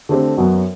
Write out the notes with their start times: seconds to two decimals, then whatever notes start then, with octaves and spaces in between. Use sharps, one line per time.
0.09 D3 A3 C4 G4
0.37 F#2 F#3 B3 F#4